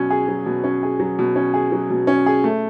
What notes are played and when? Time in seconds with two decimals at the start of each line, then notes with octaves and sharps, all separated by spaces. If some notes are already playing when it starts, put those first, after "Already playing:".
Already playing: B2 F#3 C#4
0.10 G#4
0.28 F#3
0.46 B2
0.64 C#4
0.83 G#4
1.00 F#3
1.19 B2
1.36 C#4
1.54 G#4
1.72 F#3
1.90 B2
2.07 C#4
2.26 G#4
2.44 A3